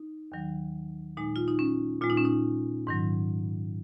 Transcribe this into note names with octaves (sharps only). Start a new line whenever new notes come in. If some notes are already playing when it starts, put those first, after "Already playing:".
Already playing: D#4
D#2 D#3 F#3
A#2 G#3 D#4
F4
D#4
C#4
A#2 G#3 F4
D#4
C#4
D#4
G#2 D#3 F#3